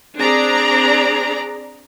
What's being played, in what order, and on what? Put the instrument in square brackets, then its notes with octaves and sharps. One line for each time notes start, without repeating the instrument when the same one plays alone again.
[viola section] C4 D4 G#4 D5 A#5